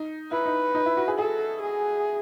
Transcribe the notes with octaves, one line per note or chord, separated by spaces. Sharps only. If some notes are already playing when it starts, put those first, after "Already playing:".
Already playing: D#4
E4 B4
D#4
D#4
E4
F#4
G#4
G#4 A4
G#4